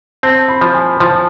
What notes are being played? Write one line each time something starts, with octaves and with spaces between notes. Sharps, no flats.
C4 A5
B5
F3
G#5
F3 A5